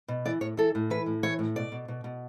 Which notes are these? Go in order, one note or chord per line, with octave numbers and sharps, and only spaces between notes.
B2
E3 D5
A2 C#5
E3 A4
A2
E3 B4
A2
E3 C#5
A2
B2 D5
B2
B2
B2